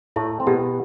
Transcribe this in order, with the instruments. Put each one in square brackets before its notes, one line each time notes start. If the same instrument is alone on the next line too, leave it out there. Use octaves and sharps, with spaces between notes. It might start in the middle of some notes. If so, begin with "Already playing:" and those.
[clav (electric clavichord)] A2 A3 [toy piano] E4
[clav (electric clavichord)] C4
[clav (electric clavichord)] B2 B3 [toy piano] G4